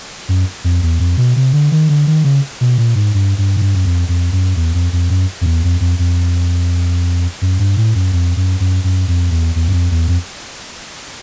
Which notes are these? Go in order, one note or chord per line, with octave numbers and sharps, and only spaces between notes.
F#2
F2
E2
F2
B2
C3
D3
D#3
D3
D#3
C#3
B2
A#2
G#2
G2
G2
G#2
G2
F#2
F2
F2
F#2
E2
F2
F2
F#2
F2
E2
F2
F2
F2
F#2
G2
A2
F#2
F2
F#2
F#2
F#2
F2
E2
E2
F#2
F2
E2
F2